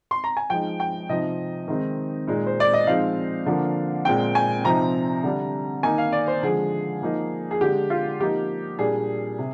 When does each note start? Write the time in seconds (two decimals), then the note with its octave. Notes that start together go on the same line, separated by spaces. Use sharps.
0.11 C6
0.24 A#5
0.37 G#5
0.50 F3 G#3 D#4 G5
0.80 G5
1.09 C3 F3 C4 D#4 D#5
1.68 D#3 G#3 C4 D#4
2.27 A#2 G#3 D#4
2.47 C5
2.60 D5
2.73 D#5
2.87 F3 G#3 C4 D#4 F5
3.46 D3 F3 A#3 D4
4.05 A#2 G#3 C4 G5
4.35 G#5
4.64 C3 F3 C4 D#4 A#5
5.23 D3 G3 D4
5.83 D#3 A#3 D#4 G#5
5.98 F5
6.12 D5
6.28 C5
6.43 D3 F3 G#3 G#4
7.02 F3 A#3 D#4
7.51 G#4
7.61 D3 G#3 D4 G4
7.90 F4
8.20 F3 A#3 D#4 G4
8.79 A#2 G3 D4 G#4
9.39 C3